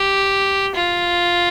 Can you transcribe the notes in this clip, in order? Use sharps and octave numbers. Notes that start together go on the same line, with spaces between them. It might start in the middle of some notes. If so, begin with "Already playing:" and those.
Already playing: G4
F4